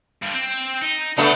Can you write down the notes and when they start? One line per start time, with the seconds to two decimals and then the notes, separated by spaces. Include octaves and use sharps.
0.23 G2 D3
0.34 C4
0.82 D#4
1.18 C#3 A3 B3 D4